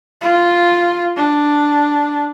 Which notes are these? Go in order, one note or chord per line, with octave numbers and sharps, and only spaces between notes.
F4
D4